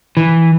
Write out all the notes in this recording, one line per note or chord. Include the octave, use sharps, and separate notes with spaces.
E3